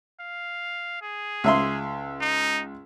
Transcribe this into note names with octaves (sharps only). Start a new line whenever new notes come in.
F5
G#4
C#2 E5 C6
D#4